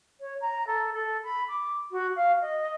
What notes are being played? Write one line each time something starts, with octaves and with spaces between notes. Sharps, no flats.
C#5
A#5
A4
A4
B5
D6
F#4
F5
D#5